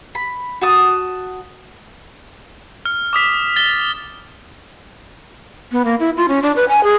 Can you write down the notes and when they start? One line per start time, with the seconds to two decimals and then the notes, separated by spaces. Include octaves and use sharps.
0.15 B5
0.61 F#4 A5 D#6
2.85 F6
3.13 D6 D#6 B6
3.56 A6 G7
5.72 B3
5.85 A#3
6.00 E4
6.17 F4
6.28 C#4
6.43 D4
6.56 B4
6.69 G#5
6.84 G#4